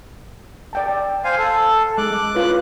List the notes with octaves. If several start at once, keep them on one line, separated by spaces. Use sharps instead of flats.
D5 G5 A5
C5 F5 G#5
A4
G#3 D6 F#6
F4 B4 C#5